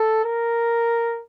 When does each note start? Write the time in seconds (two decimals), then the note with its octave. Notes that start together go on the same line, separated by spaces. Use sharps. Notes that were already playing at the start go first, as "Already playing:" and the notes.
Already playing: A4
0.24 A#4